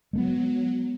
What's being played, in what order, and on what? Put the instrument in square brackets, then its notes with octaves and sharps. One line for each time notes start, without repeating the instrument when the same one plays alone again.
[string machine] F#3 [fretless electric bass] G#3 A3 B3